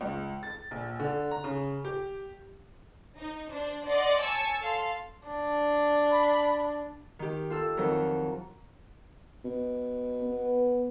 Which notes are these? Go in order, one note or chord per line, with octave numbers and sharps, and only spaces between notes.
C#2
A6
A#1
D3
A#5
C#3
G4
D#4
D4 C5
D5 D#5 F#5 C6 D6
C#5 G#5 A5 E6 C#7
A4 F5 C6
D4
B5
D#3 G4
F4 A4 E6
F2 D#3 F#3 A#4
B2
B3